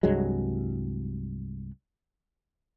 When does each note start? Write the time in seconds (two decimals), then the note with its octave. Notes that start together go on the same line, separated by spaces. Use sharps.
0.03 C2 G2 F#3 G#3